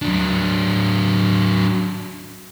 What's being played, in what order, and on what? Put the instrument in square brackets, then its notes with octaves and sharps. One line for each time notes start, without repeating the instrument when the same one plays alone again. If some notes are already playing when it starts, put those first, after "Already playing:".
[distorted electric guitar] F#3 D4